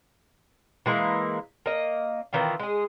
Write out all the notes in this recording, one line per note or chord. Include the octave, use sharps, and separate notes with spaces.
E3 G#3 A#3
A#3 D#5
D#3 E3 C4 F4
G#3 G#4